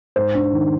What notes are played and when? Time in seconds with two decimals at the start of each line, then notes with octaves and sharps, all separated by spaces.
0.16 G#2 C5
0.35 D4
0.53 D#3